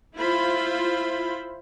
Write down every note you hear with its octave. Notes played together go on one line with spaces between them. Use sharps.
E4 F4 C5 B5